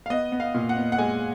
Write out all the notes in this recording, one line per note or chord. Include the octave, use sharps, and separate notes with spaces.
F5
B3 D#5
B3
F5
A#2
F#5
B3
F#5
G#3 G#5